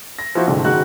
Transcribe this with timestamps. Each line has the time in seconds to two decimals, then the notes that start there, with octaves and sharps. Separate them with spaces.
0.19 A#6
0.35 F3 E4 F#4 C5
0.47 C2 G#2 D3
0.65 F#1 D#3 G#3 F#4 F#6